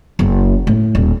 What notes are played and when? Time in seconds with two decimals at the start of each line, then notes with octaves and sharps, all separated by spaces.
0.19 F#1
0.67 A2
0.95 D#1